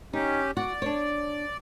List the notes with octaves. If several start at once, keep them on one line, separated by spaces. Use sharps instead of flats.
C#4 D#4 G4
F#4 D5
D4 C#5